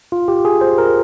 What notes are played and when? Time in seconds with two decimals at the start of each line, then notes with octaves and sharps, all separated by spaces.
0.12 F4
0.28 G4
0.45 G#4
0.61 C5
0.78 A#4